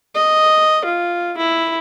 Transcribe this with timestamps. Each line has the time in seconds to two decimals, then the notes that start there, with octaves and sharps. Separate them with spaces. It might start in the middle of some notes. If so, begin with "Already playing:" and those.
0.16 D#5
0.85 F4
1.37 E4